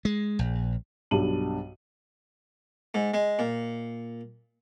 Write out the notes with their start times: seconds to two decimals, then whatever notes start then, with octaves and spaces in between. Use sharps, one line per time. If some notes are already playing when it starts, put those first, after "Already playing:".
0.05 G#3
0.39 A#1
1.11 B1 G2 D#7 F#7
2.94 G#2
3.14 G#3
3.39 A#2